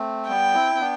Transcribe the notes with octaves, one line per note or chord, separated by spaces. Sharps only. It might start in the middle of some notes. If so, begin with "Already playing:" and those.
Already playing: A3 C4
G3 B3 G5
C4 E4
C4
B3 D4